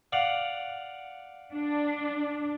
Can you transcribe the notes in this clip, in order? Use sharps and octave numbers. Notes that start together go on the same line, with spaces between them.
D5 F5 F#5
D4